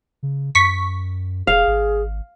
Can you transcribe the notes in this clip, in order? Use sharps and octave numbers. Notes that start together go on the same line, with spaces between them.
C#3
F#2 C#6 B6
E1 G#4 F5
G#1